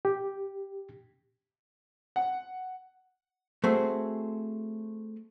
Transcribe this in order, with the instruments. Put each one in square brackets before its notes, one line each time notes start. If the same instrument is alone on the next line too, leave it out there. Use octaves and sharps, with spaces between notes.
[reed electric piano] G4
[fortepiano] F#5
[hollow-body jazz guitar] A3 C4 F#4 G#4 C5